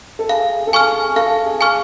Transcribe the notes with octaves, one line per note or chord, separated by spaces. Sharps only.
A4
G#4 F5
A4
G#4 G#5 C#6 F6
A4 F5
G#4
G#5 C#6 F6